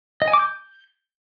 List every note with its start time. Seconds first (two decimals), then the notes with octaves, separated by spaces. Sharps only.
0.22 D#5
0.28 G#5
0.33 D6
0.39 G6